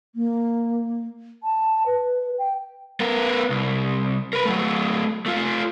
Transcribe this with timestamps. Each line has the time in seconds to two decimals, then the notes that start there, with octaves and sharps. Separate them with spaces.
0.15 A#3
1.43 A5
1.86 B4
2.38 G5
3.00 B3 A#4
3.50 C2
4.33 A#4 B4
4.45 F#3 A3
5.26 A3 F4